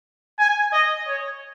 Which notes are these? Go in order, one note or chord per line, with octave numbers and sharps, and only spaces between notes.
G#5
D#5
C#5